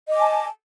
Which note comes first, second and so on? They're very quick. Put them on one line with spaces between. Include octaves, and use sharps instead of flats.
D#5 D6 G#5 A5